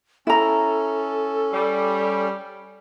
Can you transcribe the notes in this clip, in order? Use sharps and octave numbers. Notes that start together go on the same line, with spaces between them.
C#4 E4 A4 A#5
G3